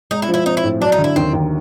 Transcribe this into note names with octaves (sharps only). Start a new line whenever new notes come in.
G#3 D#4
E4
F3
E4
C4 D#4
E4
A2
F#3 D4
D#4
D3
E4
D#2 C4
D#2